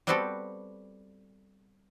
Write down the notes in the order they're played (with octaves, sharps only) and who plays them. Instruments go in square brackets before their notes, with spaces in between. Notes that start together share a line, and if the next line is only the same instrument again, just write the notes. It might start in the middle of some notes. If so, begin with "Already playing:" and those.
[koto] G3 B3 C4 F#4 G4 A4